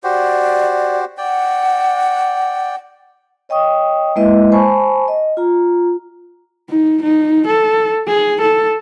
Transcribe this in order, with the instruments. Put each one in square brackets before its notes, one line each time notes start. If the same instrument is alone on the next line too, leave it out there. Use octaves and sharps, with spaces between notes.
[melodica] F#4 G4 C5 [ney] D5
[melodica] D5 G5 [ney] F#5
[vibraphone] C#5 D#5 G5 C#6 D#6
G#3 A#3 E4 B4 D#5 E5
C5 G#5 A5 B5 C#6
D#5
F4 A#5
[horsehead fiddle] D#4
D#4
A4
G#4
A4